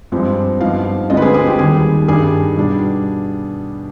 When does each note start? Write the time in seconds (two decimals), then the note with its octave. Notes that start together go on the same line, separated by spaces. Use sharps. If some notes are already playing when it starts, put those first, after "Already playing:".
0.12 G2 F3 G#3 C4
0.60 G2 F3 B3 D#4 F5
1.10 D2 D3 G#3 C4 F4 D#5
1.17 B4
1.22 G#4
1.34 G#4
1.47 G4
1.59 D#2 D#3 G3 G#4
2.08 G2 D#3 G3 D4 G#4
2.57 B2 G3 D4